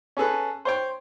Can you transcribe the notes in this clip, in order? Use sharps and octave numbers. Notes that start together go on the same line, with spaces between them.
C#4 G#4 A4 B4
C5 C#5 G5